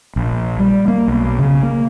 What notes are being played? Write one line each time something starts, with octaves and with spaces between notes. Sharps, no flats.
A#1
G3
A#3
B1
C#3
A#3